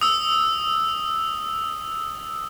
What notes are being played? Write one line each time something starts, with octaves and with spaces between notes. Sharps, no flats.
D#6 E6